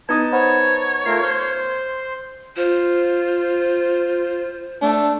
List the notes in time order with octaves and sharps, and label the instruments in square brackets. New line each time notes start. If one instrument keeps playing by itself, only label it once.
[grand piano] B3 D#4 D#6 [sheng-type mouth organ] A5 [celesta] G#6
[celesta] C5 F#5 B5 [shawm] C#5
[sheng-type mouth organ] A3 F4 A#4 [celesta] C7
[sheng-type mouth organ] C5 C6 [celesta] F6
[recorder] F4 [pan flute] C5
[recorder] A3 [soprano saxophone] D4